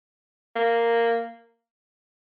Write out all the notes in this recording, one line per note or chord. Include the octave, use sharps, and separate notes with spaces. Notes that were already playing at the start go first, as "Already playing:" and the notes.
A#3